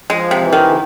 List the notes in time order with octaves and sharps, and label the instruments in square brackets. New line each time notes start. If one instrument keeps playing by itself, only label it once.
[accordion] F3 [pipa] G#3
[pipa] C3
[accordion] E3
[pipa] D#3
[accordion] D3